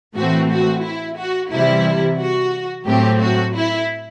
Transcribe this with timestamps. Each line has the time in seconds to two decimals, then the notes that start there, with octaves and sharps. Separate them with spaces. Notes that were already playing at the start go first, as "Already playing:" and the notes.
0.16 A2 E3 A3 C4 F#4
0.51 F#4
0.84 E4
1.18 F#4
1.52 C3 E3 G3 E4
2.19 F#4
2.87 A2 F#3 A3 C4 G4
3.21 F#4
3.55 E4